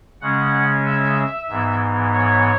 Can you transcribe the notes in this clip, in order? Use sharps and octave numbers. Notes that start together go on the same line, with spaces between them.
C#3 G#3 C#4 F#5
E5
G#2 E3 B3
C#5